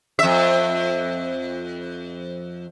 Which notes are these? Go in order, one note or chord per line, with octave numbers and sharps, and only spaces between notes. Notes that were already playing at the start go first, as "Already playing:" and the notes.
F2 E5